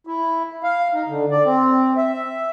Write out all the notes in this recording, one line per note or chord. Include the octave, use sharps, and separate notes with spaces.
E4
F5
D#4
D3
D5
C4
E5